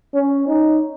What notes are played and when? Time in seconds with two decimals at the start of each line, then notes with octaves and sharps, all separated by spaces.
0.14 C#4
0.48 D#4